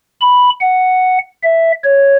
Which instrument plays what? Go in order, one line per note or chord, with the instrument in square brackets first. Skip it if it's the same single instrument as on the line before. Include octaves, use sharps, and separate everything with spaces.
[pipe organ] B5
F#5
E5
C#5